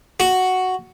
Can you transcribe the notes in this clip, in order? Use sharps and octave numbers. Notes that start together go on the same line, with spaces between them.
F#4